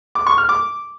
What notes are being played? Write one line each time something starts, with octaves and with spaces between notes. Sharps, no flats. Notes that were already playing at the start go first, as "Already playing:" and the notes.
D6
C#6
F6
D6